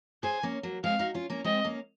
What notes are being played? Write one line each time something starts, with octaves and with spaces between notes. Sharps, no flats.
G#4 C5 G#5
A#3 C#4
F#3 A#3
G#3 C4 F5
D#4 F#4
C#4 F4
A#3 C#4
G#3 C4 D#5
A#3 C#4